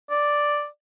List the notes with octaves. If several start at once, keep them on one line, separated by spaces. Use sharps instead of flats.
D5